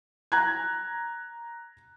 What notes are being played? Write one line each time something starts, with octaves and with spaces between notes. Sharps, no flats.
A#5 F#6 G#6